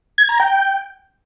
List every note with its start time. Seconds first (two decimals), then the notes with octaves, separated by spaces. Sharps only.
0.18 G#6
0.29 A#5
0.40 G5